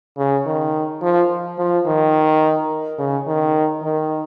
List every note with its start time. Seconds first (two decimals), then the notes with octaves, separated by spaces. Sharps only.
0.18 C#3
0.46 D#3
1.02 F3
1.58 F3
1.86 D#3
2.99 C#3
3.27 D#3
3.83 D#3